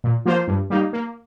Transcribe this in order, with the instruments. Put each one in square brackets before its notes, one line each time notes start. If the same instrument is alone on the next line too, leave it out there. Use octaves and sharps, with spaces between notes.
[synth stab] A#2
F3 A#3 F4 C5
G2
G3 A#3 D#4
A#3